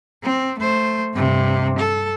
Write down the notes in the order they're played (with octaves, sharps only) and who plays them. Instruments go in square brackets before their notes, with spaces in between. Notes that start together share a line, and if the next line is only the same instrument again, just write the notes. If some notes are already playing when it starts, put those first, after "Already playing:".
[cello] C4
A3 C5
G2 C3
A4